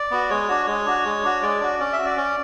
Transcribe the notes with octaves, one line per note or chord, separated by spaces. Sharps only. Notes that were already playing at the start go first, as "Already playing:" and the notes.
Already playing: D5
B3 F#4
G#3 C#5
D4 F#4
G#3 C#5
D4 F#4
G#3
D4 F#4
G#3 D5
D4 F#4
C#4 D5
E5
F#4
D5
C#4